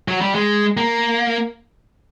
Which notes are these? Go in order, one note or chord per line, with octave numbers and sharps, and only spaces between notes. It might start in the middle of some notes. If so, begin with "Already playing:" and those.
F#3
G3
G#3
A#3